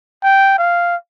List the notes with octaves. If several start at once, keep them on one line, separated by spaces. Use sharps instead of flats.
G5
F5